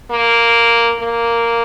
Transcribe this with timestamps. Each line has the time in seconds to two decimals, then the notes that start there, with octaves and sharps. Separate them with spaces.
0.11 A#3
1.00 A#3